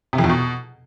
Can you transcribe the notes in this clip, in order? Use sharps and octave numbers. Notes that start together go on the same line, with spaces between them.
C3
F2
E2
B2